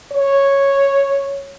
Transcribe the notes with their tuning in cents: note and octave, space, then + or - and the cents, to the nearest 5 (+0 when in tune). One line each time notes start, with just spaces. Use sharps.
C#5 -5